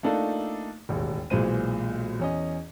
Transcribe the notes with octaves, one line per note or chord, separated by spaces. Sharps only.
A3 A#3 D4 D#4 F4 A4
E1 A1 D#2
B1 A#2 E3 G#3 C5 D#7
E2 C#4 D#5